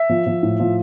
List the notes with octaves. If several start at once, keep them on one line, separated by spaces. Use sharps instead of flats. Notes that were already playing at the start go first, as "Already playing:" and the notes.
Already playing: E5
F3
F3
A2
F3